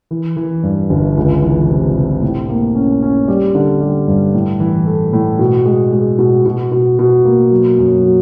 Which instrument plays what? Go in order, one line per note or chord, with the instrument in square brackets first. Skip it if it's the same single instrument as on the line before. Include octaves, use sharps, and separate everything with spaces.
[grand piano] E3
E3
G2
G1
C#2
E3
C3
C3
A2
A#3
C#4
C#4
G3
D3
G3
G2
A2
E3
A3
A2
B2
G#3
G#3
B2
B2
B2
B2
A#3
F#3
F#2
F#3